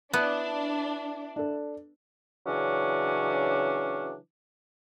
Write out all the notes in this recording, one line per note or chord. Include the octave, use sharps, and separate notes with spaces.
B3 D4 E4
D4 A4
C#3 E3 F#3 C#4 D4